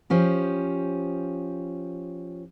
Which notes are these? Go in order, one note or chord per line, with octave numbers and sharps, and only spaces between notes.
F3 C#4 G4